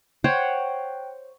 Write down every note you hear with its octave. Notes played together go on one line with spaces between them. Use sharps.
C5 C#5 F#5 G5